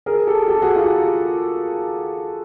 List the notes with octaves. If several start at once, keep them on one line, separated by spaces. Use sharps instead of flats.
G#4 A#4
G4 A4
G4 A4
F#4 G#4
F4 G4